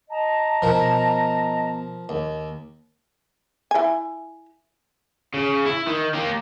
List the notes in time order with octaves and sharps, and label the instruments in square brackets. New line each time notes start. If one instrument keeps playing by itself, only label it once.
[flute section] D#5 A5 A#5
[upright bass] B2 B3 [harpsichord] F3 A#4
[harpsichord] D#2
[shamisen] E4 G#5
[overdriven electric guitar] C#3
E4
D#3
A#3 G4